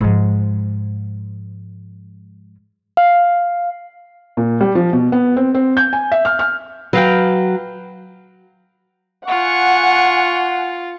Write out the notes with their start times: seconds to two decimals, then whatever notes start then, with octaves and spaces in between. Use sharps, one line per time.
0.01 G#2 F3
2.97 F5
4.37 A#2
4.61 G3
4.75 F3
4.93 B2
5.12 B3
5.37 C4
5.55 C4
5.77 G6
5.93 G#5
6.12 E5
6.25 F6
6.39 F6
6.93 F#3 B4 F5 G5
9.28 F4 F#5 G#5 C#6